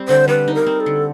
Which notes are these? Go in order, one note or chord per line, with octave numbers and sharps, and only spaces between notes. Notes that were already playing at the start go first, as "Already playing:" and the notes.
Already playing: G3 C4
D3 C5
G3 B4
D#4
A#4
C4
A4
D3